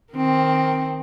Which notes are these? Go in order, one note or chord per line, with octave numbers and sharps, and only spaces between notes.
D#3 C4